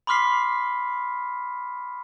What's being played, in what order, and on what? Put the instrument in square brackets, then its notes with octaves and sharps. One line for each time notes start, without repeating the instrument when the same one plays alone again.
[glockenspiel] B5 C6 D6 F6 B6 C7